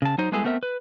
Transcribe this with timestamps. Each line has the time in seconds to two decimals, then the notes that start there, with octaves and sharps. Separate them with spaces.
0.02 C#3 A5
0.18 F#3 D#4 C5
0.32 G3 G#3 B3 E4 G#4 A4
0.44 A3 B3 C4 A#4 D5 E5
0.63 B4